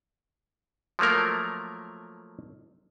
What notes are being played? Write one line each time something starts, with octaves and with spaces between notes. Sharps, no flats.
F3 F#3 A3 A#3 A#4